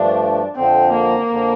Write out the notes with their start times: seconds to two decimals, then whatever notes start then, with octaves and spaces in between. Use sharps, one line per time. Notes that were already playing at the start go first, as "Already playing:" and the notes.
Already playing: G2 F3 A3 D4
0.56 F2 D3 F3 C4
0.93 A#3
1.30 F2 D3 F3